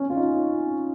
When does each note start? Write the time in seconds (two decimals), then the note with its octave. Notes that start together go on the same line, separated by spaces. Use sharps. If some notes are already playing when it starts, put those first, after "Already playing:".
Already playing: C#4
0.10 F4
0.16 D#4